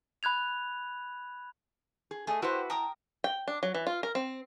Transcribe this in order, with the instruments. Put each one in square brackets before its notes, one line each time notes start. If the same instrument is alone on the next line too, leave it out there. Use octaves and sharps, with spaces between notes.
[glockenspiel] B5 F#6 G#6 F7
[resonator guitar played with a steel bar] G#4
[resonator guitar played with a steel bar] A3 D#5 [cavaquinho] G#4
[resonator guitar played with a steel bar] E4 F#4 B4 [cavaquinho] G4 C5
[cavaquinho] A#4 G5 D#6 [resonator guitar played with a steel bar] A5 A#5
[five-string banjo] G5
D4
F#3
E3
F4
A#4
C4